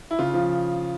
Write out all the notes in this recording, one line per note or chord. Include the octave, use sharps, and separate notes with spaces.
E4
C#3 F4
F3